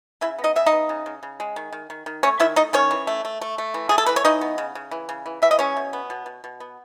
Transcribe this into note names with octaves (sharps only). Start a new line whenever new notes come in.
C#3 E4 E5
B3
D#4 D#5
C#3 E5
D#4 D#5
B3
C#3
C#3
C#3
G#3
D#3
D#3
D#3
D#3
A3 C#4 C#5
D#3 E4 E5
A3 D#4 D#5
D#3 C#4 C#5
E3
A3
A3
A3
A3
E3
A3 G#4
A4
E3 B4
C#5
E3 D#4 D#5
B3
C#3
C#3
E3
C#3
E3
E3 E5
D#5
G#3 C#4 C#5
B2
B3
B2
B2
B2
B3